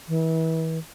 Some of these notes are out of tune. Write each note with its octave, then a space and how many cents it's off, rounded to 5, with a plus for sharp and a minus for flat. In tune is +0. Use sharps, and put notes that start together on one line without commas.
E3 -35